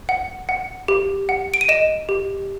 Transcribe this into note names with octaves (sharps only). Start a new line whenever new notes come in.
F#5
F#5
G4
F#5
D7
D#7
D#5 E7
G4